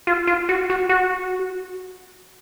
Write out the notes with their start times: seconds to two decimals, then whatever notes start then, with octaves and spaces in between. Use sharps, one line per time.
0.07 F4
0.27 F4
0.49 F#4
0.70 F#4
0.89 F#4